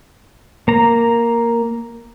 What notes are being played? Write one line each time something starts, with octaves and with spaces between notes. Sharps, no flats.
A#3 A#5